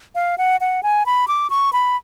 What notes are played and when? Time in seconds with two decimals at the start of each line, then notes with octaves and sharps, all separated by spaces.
0.15 F5
0.38 F#5
0.61 F#5
0.83 G#5
1.06 B5
1.28 D6
1.50 C#6
1.73 B5